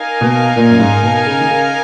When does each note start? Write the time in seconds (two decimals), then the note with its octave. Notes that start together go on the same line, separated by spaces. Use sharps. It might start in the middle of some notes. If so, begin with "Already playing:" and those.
Already playing: D#4 A#4 F5 G#5
0.21 B2
0.56 A#2
0.69 F#2
0.80 G#2
1.03 B2
1.26 C#3
1.40 D#3
1.49 C#3